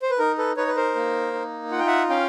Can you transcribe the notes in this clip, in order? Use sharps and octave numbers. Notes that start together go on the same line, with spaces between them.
C5
B4
D#4 A#4
A4 B4
D#4 B4 C#5
B4
A#4 C5
A#3
D#4
F4 F#5
G5
E5 F#5
C#4 F5 G5